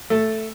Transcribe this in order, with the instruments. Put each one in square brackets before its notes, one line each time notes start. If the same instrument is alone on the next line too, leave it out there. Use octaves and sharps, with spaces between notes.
[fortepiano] A3